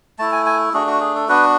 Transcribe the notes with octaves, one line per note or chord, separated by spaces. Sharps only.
A3 E4 A5
G#5
G#5
A3 D4 F#4 G#4
F#4
G#4
A4
B3 D4 F#4 B4